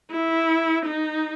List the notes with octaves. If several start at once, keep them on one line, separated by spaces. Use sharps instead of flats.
E4
D#4